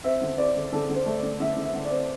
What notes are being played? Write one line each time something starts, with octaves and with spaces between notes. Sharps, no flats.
C4 E5
D3
C4 D5
D3
D3 A4
D3
C5
A3
D5
D3
D3 E5
D3
E5
D3
D5
C4